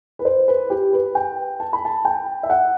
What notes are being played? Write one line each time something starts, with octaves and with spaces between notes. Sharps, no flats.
B4
C5
B4
G4
B4
G5
A5
B5
A5
G5
E5
F#5